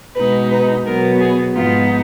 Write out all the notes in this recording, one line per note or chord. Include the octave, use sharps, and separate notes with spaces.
B2 G#3 D#4 B4
B4
B2 F#3 B3 A#4
G#4
G#2 F3 B3 D#4 F4